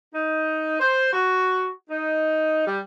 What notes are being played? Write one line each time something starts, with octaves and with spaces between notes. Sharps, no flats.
D#4
C5
F#4
D#4
G3